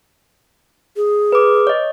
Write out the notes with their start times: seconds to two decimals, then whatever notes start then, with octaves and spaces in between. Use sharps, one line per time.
0.96 G#4
1.32 B4 D6
1.67 C#5 D#5